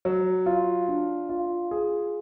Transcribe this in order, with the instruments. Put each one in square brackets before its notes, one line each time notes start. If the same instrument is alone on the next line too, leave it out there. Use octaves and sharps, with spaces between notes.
[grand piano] F#3
F4
D4
F4
G#4